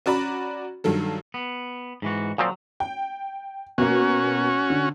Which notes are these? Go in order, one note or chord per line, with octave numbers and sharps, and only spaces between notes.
C#4 F#4 D5 A#5 B5
G2 D#3 F#3 A4
B3
G#2 E3 F#4
A#2 F3 F#3 C4
G5
B2 A#3 C#4 F#4
D3